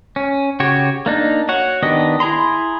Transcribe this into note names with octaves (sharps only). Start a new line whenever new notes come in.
C#4
C#3 F#4 G4 C#5
A#3 D4 D#4
F#4 C#5 F#5
D#3 B3 D4 G4 D#5
E4 G#4 A#5 C6